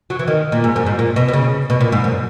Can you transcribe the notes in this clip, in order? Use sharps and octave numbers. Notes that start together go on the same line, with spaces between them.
F#3
E3
D#3
A#2
G#2
F#2
G#2
A#2
B2
B2
C#3
B2
A#2
G#2
F#2